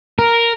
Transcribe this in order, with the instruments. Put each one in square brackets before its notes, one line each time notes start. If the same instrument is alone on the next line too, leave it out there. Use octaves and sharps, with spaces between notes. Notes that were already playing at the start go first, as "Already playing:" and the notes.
[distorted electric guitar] A#4